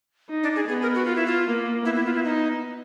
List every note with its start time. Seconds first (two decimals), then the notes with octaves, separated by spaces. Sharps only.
0.30 D#4
0.43 D4
0.56 G#4
0.68 B3 G#4
0.82 A#4
0.95 F#4
1.05 F4
1.16 E4
1.26 F4
1.47 A#3
1.85 B3 E4
1.96 E4
2.05 F4
2.15 E4
2.25 D#4